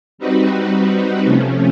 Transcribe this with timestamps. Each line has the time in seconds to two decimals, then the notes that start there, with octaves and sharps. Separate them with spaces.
0.18 G3 C4 D#4 F#4 B4
1.25 C3 F3 A3 C#4